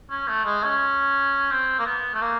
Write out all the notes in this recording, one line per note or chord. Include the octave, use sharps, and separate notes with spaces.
C#4
A3
G#3
C#4
C4
A#3
B3
A3
A#3